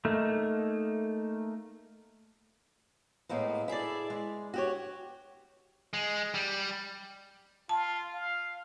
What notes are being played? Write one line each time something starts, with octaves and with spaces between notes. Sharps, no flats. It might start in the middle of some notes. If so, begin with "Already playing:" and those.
A3 A#3 D#4
A2 G#3 A#3 B3
E4 G#4 A4 D5
G#3
F#4 G4 C#5
G#3
G3
F4 A5
F5